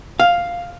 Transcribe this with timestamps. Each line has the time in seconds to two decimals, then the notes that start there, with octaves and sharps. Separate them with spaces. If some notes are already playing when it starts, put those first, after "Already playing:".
0.20 F5